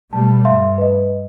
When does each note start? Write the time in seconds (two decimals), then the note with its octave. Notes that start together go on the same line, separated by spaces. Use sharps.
0.13 B2 G3 A3 A5
0.45 G2 E5 F5 C6
0.78 B4 D#5